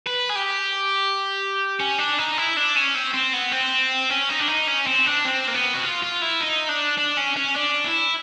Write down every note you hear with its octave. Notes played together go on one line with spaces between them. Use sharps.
B4
G#4
G4
C#4
D4
D#4
E4
D4
C#4
C4
C4
B3
C4
C#4
D#4
D4
D#4
C#4
C4
D4
C4
A#3
B3
F#4
F4
F4
E4
D#4
D4
D4
C#4
C#4
D4
E4